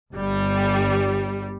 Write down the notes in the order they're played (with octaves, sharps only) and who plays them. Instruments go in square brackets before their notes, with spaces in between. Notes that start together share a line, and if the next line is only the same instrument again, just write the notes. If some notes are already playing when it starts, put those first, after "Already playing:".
[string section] G1 G3